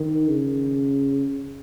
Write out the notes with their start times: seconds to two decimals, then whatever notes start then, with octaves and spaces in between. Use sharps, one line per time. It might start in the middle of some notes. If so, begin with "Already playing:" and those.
Already playing: D#3
0.28 C#3